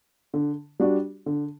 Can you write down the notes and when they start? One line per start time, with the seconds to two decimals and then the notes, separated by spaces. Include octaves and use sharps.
0.34 D3
0.80 G3 D4 F#4
1.26 D3